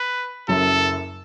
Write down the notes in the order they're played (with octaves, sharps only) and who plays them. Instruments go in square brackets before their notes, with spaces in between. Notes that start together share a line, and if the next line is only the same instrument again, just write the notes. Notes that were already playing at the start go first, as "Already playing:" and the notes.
Already playing: [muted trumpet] B4
[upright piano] F#1 F#2 F#3 [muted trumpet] A4